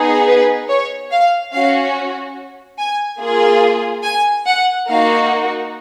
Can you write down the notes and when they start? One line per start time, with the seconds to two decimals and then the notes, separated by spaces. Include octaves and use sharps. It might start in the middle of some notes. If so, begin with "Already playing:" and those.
Already playing: B3 D#4 G#4
0.27 B4
0.69 C#5
1.11 F5
1.53 C#4 F#4 F5
2.79 G#5
3.21 A#3 F4 G#4
4.04 G#5
4.46 F#5
4.88 A#3 D#4 F#4 F5